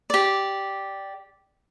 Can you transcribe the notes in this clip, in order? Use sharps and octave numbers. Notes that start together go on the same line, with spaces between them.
G4 D5